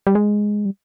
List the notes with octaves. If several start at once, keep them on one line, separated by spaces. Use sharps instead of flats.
G3
G#3
G3